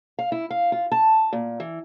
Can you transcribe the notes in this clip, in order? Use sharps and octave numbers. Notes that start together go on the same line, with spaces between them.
F5
E4
F5
F4
A5
A#2
E3